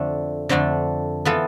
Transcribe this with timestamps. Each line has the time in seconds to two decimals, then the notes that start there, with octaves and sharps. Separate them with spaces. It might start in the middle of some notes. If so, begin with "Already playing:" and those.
Already playing: F2 D3 A3 D4
0.49 F2 D3 A3 D4
1.25 E3 B3 F4 A4